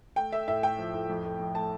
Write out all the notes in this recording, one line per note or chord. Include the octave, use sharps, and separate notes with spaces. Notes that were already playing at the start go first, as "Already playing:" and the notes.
A3 G5
A3 E5
A2 E5
A3 G5
F3
A2
F2
A3
F2
A3 A5